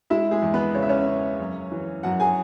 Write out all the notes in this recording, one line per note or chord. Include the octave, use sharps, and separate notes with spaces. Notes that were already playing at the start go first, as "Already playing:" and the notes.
G#3 E4 E5
G#3 G#4
E2
B3 B4
C#3 C#5
E5
C#4 C#5
C#3
F#2
E3
F#2 F#4 F#5
G#4 G#5